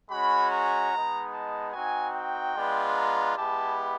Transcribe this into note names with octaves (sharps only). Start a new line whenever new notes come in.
G#3 C#4 F#4 B5
A#5
G#3 B3 D#4
A5
C4 D#4 F#4 G#5
G5
G#3 B3 D4 F4
A#5
G#3 B3 E4 G4 A5